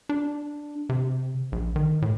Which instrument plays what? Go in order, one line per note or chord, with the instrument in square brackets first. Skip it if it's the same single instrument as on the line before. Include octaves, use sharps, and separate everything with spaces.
[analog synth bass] D4
C3
A#1
D#3
A2